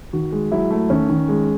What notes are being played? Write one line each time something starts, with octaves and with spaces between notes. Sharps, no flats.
D#3 F#4
G#3
F#3 E4
A3
D#3 C#4
D#3
G#3